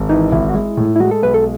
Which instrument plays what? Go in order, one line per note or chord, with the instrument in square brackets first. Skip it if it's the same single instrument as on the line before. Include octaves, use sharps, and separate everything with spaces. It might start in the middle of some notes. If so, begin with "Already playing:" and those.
Already playing: [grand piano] G#1
[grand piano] E3 [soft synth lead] D#4
[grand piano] G#1 [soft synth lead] E4
[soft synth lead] F#4
[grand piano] G#3 [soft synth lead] E4
[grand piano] A2
[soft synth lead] E4
[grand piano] G#3 [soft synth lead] F#4
[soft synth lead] A4
[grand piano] B1 [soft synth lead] B4
[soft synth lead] A4